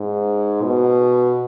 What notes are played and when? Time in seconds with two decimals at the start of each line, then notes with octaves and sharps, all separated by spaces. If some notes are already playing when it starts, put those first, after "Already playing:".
Already playing: G#2
0.63 B2